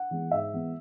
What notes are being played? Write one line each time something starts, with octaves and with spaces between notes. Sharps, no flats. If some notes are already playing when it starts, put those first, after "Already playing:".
Already playing: F#5
E3 G#3 B3
G#2 E5
E3 G#3 B3